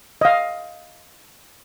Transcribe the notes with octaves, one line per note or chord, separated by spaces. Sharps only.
D#5 F5